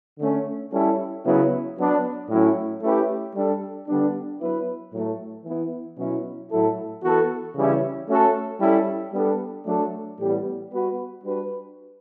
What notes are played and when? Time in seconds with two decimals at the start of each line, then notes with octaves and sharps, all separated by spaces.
0.19 D3 A3 C#4
0.72 G3 C#4 E4 A4
1.25 C#3 F#3 B3 E4
1.77 F#3 B3 D4
2.29 A2 F#3 A3 C#4 E4
2.82 A3 C#4 E4 G4 B4
3.35 G3 D4 A4
3.87 D3 G3 B3 D4
4.40 F#3 B3 E4 B4
4.92 A2 F#3 A3
5.45 E3 B3 E4
5.98 B2 F#3 C#4 E4
6.50 A2 F#3 A3 E4 A4
7.02 E3 B3 F#4 A4
7.55 C#3 E3 G3 C#4 E4
8.08 A3 C#4 F#4 A4
8.60 G3 C#4 E4 A4
9.13 G3 B3 D4 A4
9.65 F#3 A3 D4 A4
10.18 A2 E3 G3 B3
10.70 G3 B3 F#4 B4
11.23 G3 D4 F#4 B4